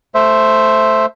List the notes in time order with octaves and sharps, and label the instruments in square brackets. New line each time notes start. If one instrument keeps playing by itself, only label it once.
[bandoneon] A3 C5 E5